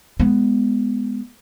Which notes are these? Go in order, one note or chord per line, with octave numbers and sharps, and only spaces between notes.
G#3 B3